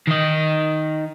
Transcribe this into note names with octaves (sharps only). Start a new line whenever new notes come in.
D#3 D#5